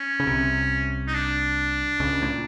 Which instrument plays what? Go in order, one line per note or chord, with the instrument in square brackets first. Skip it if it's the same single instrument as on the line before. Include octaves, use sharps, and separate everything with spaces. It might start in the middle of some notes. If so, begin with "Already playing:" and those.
Already playing: [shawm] C#4
[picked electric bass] C#3
C2 C3
[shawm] D#4
D4
[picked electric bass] C#2 C#3
A2
A#2